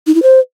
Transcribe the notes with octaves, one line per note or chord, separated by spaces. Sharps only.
D#4
E4
C5